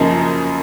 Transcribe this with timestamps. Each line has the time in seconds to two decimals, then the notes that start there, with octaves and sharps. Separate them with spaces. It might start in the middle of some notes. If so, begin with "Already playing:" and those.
Already playing: F#2 C#3 F3 A#3 D#4